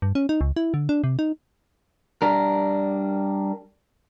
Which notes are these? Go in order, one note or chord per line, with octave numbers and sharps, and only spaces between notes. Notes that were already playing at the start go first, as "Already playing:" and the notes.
G2
C#4
D#4
C#2
E4
D3
D4
C3
D#4
G3 D4 A#4